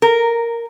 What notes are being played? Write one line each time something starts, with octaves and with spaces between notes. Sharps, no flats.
A#4